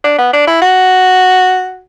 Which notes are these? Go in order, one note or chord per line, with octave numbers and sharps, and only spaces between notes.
D4
B3
D4
E4
F#4